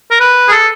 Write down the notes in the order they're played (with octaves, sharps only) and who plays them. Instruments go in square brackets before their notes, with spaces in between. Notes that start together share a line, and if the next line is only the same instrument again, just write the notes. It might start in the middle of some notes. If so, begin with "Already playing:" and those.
[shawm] A#4
B4
G#4
A4